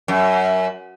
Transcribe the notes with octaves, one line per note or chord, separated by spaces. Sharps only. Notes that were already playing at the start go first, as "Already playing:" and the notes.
F#2